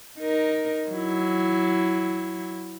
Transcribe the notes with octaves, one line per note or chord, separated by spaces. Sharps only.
D#4 A#4
F#3 E4